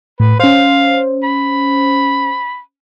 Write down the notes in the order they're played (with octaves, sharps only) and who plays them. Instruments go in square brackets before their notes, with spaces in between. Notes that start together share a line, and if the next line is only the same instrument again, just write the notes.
[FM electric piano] A2 [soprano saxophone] B4
[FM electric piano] C#4 C5 [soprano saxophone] F5
[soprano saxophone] B5